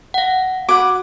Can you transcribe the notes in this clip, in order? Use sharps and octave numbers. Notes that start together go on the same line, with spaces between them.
F5 F#5
F#4 F#5 D6